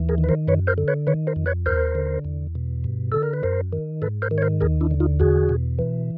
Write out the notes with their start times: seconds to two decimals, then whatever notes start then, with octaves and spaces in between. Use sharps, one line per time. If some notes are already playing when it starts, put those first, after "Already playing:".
Already playing: D#2 E3
0.09 G#4 A#4
0.18 D#3
0.24 B4
0.29 A#4 C5
0.48 F#2 B4 C#5
0.67 A#4 C5
0.78 D3
0.88 B4 C#5
1.07 D#3 B4 C#5
1.27 A#4 C5
1.36 F2
1.46 B4 C#5
1.66 D#2 A#4 C5
1.95 D3
2.25 E2
2.55 B2
2.84 G2
3.12 D3 A4
3.23 A#4
3.34 B4
3.43 F#2 A#4 C5
3.73 D#3
4.02 G#2 A4 B4
4.22 A#4 C5
4.31 D#3
4.38 C#5
4.42 A#4 C5
4.61 D#2 G#4 A#4
4.81 D4 E4
4.91 D3
5.00 D#4 F4
5.20 E2 F#4 G#4
5.49 B2
5.79 E3